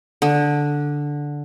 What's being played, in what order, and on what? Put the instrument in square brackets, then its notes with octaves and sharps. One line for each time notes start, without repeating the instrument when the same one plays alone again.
[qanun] D3